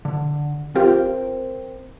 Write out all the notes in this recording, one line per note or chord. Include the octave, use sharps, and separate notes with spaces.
D3
C4 F4 G4 A#4 C5